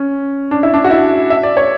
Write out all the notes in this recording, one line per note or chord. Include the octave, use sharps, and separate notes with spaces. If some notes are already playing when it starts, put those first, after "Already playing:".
Already playing: C#4
D4
E4
D4
F#4
E4
E5
D5
C#5